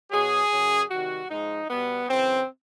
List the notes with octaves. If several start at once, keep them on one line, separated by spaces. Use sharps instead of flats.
B2 F#3 G#4
F#2 C#3 F#3
C3 D#3 G3 F#4
G#2 F3 G#3 D#4
B2 G3 B3
F#2 C#3 E3 C4